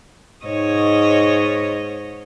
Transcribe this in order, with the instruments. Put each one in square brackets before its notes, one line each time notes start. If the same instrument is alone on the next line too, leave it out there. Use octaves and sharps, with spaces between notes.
[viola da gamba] G#2 C#5 D#5